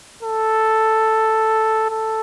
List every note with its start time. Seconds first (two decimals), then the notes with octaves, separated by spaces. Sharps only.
0.23 A4
1.91 A4